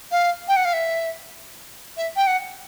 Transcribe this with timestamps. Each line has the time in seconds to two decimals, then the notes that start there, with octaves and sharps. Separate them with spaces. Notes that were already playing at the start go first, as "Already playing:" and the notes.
0.12 F5
0.48 G5
0.56 F#5
0.65 F5
0.73 E5
1.97 E5
2.16 G5
2.27 F#5